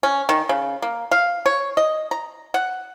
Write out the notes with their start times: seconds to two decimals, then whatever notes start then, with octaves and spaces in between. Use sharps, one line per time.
0.03 C#4
0.29 D#3
0.49 C#3
0.82 A#3
1.11 F5
1.46 C#5
1.77 D#5
2.11 A#5
2.54 F#5